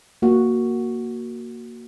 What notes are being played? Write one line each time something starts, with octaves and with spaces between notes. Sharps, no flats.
A#3 F#4